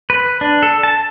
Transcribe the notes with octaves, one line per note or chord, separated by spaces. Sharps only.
B4
D4
A4
A5